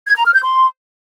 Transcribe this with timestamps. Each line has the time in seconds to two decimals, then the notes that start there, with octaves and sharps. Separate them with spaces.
0.07 G#6
0.16 A#5
0.25 F6
0.34 G6
0.43 C6